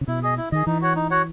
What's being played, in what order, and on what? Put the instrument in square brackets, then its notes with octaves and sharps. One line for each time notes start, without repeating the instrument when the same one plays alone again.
[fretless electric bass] C#3
[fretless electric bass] B2 [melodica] E4
[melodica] G#4 D#5
E4
[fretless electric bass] D#3 [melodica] G#4 D#5
[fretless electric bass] E3 [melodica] D#4
[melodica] F#4 C#5 F#5
D#4
F#4 C#5 F#5